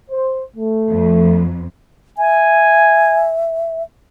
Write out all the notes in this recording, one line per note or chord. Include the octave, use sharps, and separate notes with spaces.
C5
A3
F2
E5 G#5